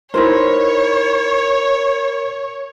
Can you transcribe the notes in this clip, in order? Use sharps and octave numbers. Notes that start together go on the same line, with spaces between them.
D#4 E4 A#4 C5 C#5 B5